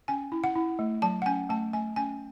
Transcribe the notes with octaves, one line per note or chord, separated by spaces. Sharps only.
C#4 G#5
E4
F#5
E4
A3
F#3 A5
F#5
C#4 G#5
A3 A5
A3 G#5
C#4 G#5